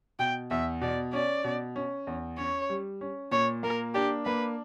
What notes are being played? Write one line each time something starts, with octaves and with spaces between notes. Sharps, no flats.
B2 G5
E2 E5
B2 D5
C#4 D5
B2
C#4
E2
C#4 C#5
G3
C#4
A#2 C#5
A#3 A#4
D4 G4
A#3 B4